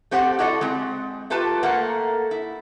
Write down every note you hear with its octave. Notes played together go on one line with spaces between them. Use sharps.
A3 C4 G4 C5 F#5
E4 F#4 A4 D5 D#5
G#3 C4
A3 F4 G4 B4 A5
A3 A#3 A#4 F#5
E4